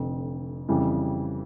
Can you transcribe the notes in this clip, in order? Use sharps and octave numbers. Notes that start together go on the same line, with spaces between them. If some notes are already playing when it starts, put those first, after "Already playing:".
Already playing: F1 F2 D3
F2 C#3 E3 G3